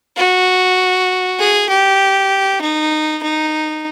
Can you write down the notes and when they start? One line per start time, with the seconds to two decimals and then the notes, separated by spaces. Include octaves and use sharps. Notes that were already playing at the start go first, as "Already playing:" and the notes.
0.17 F#4
1.39 G#4
1.69 G4
2.61 D#4
3.23 D#4